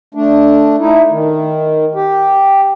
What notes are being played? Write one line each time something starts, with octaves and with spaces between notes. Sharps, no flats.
A3 D4
A3 D#4 E4
D#3
G4